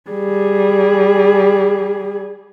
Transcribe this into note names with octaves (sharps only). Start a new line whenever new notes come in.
G3 G#4